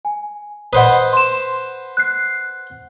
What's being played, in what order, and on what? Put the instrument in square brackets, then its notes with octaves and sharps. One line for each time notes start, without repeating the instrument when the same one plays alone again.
[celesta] G#5
[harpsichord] B4 C5 F#5 [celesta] D#5 B5 D#6
[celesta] C6 E7
F#6 C7